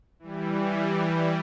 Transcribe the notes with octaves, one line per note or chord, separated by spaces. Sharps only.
E3 G3